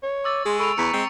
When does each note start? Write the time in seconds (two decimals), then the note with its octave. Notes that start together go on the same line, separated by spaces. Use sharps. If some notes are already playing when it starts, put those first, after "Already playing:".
0.03 C#5
0.24 C#6 D6 E6 A6
0.45 G#3 G#4 C6
0.59 A4 B5 C#6 D7 F7
0.78 E2 B3 A#5 C#6 B6 C#7
0.93 G#3 C4